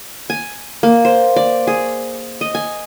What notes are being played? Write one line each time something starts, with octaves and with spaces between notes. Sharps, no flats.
G#5
A#3
C5
D5
G#4
D#5
G#5